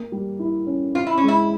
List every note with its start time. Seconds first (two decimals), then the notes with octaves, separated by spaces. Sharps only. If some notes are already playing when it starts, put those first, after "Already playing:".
Already playing: A#3
0.12 G3
0.39 E4
0.67 C#4
0.95 C4 F4
1.07 E4
1.18 C#4
1.23 G#3
1.28 E4